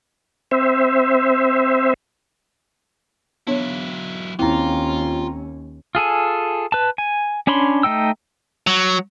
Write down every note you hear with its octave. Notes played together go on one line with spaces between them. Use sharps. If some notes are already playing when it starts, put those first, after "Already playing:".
C4 C5 E5
F#3 B3 D4 E4 C#5
D#2 C4 C#4 E4 F4 A#5
F4 G#4 A4 G#5
B4 A5
G#5
C#4 D4 C#5 B5 C6
A3 D#4 G5 E6
F#3